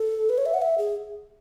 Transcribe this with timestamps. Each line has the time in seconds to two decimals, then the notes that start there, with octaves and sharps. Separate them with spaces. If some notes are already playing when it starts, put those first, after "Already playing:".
Already playing: A4
0.29 B4
0.38 C#5
0.46 E5
0.54 F#5
0.62 E5
0.78 G#4